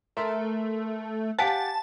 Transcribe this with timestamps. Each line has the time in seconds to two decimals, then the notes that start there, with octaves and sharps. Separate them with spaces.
0.17 A3 A#4 E5 C6
1.39 G4 C5 F5 F#5 G#5 A5